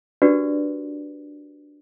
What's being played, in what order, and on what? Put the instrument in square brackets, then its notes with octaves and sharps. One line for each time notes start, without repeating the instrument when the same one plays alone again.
[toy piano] D4 F#4 G4 A#4 B4 D5